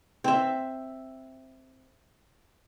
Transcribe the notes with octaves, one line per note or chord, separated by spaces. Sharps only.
C4 E5